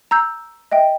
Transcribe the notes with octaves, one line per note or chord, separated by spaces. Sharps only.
A#5 E6 G6
D#5 E5 G5